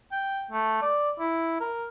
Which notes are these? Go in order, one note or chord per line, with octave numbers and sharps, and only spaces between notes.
G5
A3
D5
E4
A#4